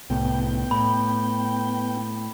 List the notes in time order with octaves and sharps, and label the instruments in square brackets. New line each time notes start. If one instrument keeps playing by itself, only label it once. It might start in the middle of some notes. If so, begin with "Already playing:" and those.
[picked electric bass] C2 A2 [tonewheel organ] B3 G5
[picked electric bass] A2 [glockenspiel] B5